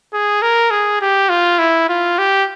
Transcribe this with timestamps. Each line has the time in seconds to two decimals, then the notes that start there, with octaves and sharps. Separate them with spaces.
0.13 G#4
0.42 A#4
0.71 G#4
1.01 G4
1.30 F4
1.59 E4
1.89 F4
2.18 G4